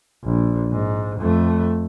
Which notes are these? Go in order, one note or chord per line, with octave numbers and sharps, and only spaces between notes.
A#1
G#2
F2 A3